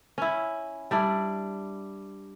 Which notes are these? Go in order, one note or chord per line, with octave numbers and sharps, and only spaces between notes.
C#4 E4
G3 D4 E4